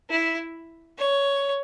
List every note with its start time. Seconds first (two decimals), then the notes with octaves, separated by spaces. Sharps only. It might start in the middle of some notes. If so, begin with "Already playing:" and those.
0.09 E4
0.98 C#5